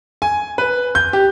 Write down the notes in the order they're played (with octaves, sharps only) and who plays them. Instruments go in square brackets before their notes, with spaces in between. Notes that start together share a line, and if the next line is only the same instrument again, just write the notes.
[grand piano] G#5
B4
G6
G4